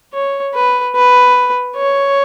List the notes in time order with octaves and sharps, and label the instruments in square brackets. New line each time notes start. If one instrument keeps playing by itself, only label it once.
[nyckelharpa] C#5
B4
B4
C#5